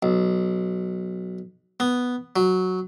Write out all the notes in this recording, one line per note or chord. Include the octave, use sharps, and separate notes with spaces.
B1
B3
F#3